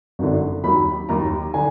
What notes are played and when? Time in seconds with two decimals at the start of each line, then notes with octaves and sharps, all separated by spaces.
0.19 G#1 F#2 D3
0.64 D#2 D#3 F#3 B5
1.09 D#2 D#3 F#3 A#5
1.54 D3 G#5